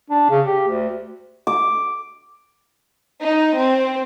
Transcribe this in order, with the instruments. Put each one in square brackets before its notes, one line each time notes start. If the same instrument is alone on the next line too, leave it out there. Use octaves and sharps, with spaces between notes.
[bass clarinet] D4
C#3
G4
D2
[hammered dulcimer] D6
[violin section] D#4
C4